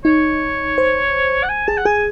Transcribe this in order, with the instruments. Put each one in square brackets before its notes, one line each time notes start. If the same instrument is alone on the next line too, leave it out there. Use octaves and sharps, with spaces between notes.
[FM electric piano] D#4 [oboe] C#5
[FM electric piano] C5
[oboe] F#5
G#5
[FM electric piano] G#4 [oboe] A5
[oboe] F#5
[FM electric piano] G#4 [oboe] G#5